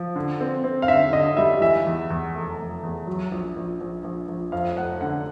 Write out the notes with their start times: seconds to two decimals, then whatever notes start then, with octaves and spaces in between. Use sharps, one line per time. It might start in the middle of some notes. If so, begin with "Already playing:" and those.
Already playing: F3
0.16 D3
0.41 C4
0.64 C4
0.82 F5
0.88 D3 E5
1.13 D3 D#5
1.37 G3 E5
1.61 E3 E5
1.86 E2
2.10 E2
2.35 F1
2.59 F1
2.83 E2
3.07 F#3
3.31 A#1
3.56 A#1
3.81 A#1
4.04 A#1
4.28 A#1
4.52 F2 F5
4.77 F1 F#5
5.01 D3 F#5